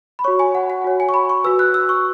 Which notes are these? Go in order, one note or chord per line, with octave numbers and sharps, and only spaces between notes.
B5
F#4 C#5 C#6
G#5
F#5
F#5
F#4 C#5
G#5
C#6
B5
C#6
F#4 B4 E6
F#6
E6
C#6